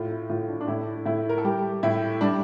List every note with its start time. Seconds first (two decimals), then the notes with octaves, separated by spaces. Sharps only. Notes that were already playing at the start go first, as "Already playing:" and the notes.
Already playing: A2 F4
0.10 E4
0.30 A2 F4
0.48 D4
0.61 D4
0.68 A2 E4
1.06 A2 E4
1.29 A#4
1.38 A4
1.44 G3 G4
1.83 A2 E4
2.21 G3 D4